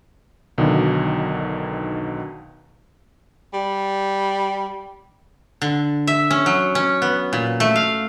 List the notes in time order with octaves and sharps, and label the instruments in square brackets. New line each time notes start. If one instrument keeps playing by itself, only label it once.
[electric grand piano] B1 B2 D3 D#3
[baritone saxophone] G3
[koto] D3
E5
C#4
F#3
C#4
B3
A#2
A3
F5